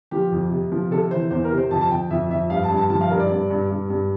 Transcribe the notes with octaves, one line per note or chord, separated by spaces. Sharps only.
F3 G4
F2
C3
F3
C3 A4
E3 C5
E2 C5
A#4
C3
C5
F2 A5
A5
F2 G5
F2 E5
F2 E5
G2 F5
A5
G2
A5
F3 A5
F5
G2 A#4
D5
G2
G2
G2
G2